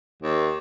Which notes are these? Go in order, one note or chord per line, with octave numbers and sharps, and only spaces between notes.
D#2